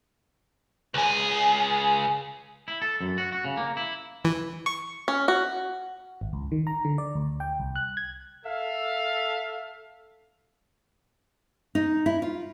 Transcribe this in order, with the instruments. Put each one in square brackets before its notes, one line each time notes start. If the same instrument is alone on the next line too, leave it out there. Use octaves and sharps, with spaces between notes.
[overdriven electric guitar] C#2 G#4
[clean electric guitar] E4
A4
F#2
F#4
F#4
C#3
A#3
E4
[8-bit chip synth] E3
C#6
[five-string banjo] C#4
F#4
[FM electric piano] G#1
C#2
D#3
A#5
D3
D5
D2
G5
C2
F#6
G#6
[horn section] A4 E5 F5
[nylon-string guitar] D#4
E4
F4